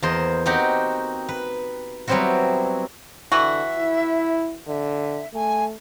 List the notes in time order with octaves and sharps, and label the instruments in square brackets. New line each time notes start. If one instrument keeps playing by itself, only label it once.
[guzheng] E2 A#3 C5 D#5
C4 D#4 F#4 G4 F#5 G5
B4
F#3 G3 B3 C4 E4 F#4
[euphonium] D3 [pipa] E3 F#4 [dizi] E5
[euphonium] E4
[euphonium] D3 [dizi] E5
[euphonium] A3 [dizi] G#5